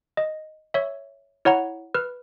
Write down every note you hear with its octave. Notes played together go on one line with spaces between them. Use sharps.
D#5
C#5 E5
E4 C#5 F#5 A#5
B4 F6